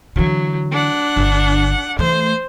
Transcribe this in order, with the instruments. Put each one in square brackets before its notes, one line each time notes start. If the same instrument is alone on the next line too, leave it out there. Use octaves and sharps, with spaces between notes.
[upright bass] D3 E3 [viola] F#3
[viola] D4 F#5
[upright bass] G1 D3
[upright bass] E3 A3 [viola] C5